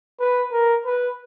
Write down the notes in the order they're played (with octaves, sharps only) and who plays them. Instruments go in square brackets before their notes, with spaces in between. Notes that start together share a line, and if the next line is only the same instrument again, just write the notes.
[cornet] B4
A#4
B4